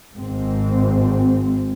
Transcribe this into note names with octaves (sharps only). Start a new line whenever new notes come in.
G#1 G#2 C4